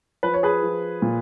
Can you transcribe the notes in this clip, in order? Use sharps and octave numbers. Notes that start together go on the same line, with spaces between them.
F3 B4
C#5
G#4 B4
F3
A#2